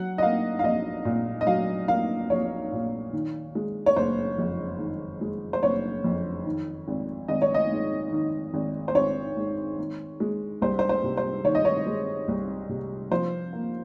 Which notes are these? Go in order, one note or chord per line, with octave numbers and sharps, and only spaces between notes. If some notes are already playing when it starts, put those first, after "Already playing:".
Already playing: F#3 F#5
D#5
A#3 F5
F5
A#1 D#5
A#2
D#5
F#3 F5
A#3 F5
A#1 C#5
A#2
D#3
G#3
C#5
F#1 C5
F2
D#3
G#3
C5
F#1 C#5
F2
D#3
G#1
G#1 D#5
C#5
D#5
G#2
D#3
G#1
C5
G#1 C#5
G#2
D#3
G#3
C2 C5
C5
C5
C3
C5
D#3 C#5
D#5
C#5
G#3
C2
C3
F3 C5
A#3